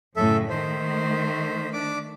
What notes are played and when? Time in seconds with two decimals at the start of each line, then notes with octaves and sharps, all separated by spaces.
0.16 F#2 A2 C#3 A4 E5
0.50 D#3 A3 C5 B6
1.73 D4 D5 D6